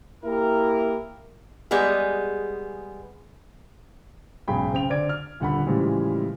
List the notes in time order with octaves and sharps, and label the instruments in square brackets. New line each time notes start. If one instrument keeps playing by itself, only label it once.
[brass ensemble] A#3 E4 G4 A#4
[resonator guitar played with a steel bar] G3 G#3 B3 G#4
[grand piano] B1 G#2 C#3 G#4 G5 B5
C#3 C4 G5 F7
D3 C5 D5 G#6 D7
F6
D#1 D3 F#5 B5
A2 C#3 E3 F3 G3 G#3